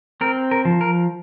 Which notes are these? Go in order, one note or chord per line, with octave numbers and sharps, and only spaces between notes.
C4 A#4
A#4
F3
A#4